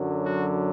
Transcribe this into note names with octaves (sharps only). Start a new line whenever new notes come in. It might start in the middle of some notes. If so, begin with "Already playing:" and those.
Already playing: F#2 D3 F#3
F#4